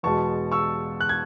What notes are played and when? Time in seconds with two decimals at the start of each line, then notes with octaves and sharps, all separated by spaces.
0.03 E2 B2 G#3 A5 C#6
0.52 C#6 E6
1.01 F#6
1.09 G#6